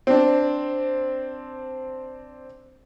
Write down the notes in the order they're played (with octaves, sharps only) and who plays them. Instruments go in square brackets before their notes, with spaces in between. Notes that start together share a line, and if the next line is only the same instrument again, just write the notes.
[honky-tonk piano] C4 D4